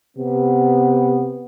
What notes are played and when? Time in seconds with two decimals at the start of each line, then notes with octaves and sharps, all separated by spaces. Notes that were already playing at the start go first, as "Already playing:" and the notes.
0.17 C3 B3